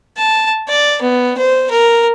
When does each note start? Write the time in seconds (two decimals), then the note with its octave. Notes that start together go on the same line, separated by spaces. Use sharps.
0.18 A5
0.68 D5
1.02 B3
1.38 C5
1.71 A#4